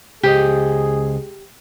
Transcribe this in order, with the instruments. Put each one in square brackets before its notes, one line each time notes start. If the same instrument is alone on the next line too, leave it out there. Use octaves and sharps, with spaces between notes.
[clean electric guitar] C#2 C5 D#5 [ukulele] G4 [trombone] G#4